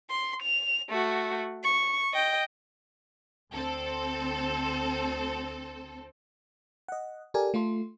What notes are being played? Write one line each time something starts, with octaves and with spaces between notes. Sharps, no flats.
C6
F7
A3 F#4
C#6
D#5 G5
D2 C4 A4
D#5 F#5
G4 A4 A#4 D5 G#5
A3 F4 A4 C6